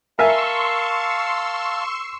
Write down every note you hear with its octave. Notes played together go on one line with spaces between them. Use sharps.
A#4 E5 F5 G#5 A5 C6 C#6 E6